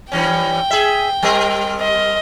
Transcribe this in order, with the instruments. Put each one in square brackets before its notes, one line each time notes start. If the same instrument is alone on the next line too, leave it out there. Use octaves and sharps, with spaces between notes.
[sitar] G2 E3 C#4 [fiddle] G5
[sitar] G#4 E5
G3 C4 A#4
[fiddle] D#5